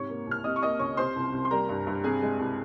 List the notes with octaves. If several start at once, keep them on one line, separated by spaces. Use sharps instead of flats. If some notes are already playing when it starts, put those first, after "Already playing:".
Already playing: G#2 C3 C#5 C#6
A#3
C2 F6
C3 D#5 D#6
C#6
A#3 D#5 D#6
C#2 C#5 C#6
C3 C5 C6
C2
C2
C6
G3 A#4 A#5
G2
G2
C3 G#4 G#5
G#3
C2